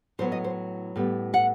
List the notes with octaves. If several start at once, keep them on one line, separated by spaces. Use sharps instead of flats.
A2 F#3 B3 C5
D#5
C5
A2 G3 B3
F#5